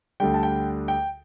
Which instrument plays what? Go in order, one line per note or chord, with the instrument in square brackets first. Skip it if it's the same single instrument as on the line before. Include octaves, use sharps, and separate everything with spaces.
[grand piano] D2 D3 G3 G5
A5
G5
G5